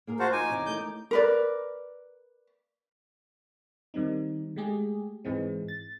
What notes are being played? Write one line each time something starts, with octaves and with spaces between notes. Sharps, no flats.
A#3 G#4 A#4
F3 F#4 C5 F5 F#5 A5
D#4 G#5 D6
E2 C3 C#4
D#3 A3 G6
A#4 B4 D5
D#3 G3 C4 D#4
G#3 A3 G4 G#4
G#2 E3 G#3 C4
A6